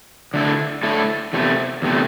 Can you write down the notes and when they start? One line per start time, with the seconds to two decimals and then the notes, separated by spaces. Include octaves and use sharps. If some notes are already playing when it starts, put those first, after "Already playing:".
0.34 D3 A3 E4 A4
0.83 D3 A3 E4 A4
1.33 E2 C3 A3
1.82 E2 C3 A3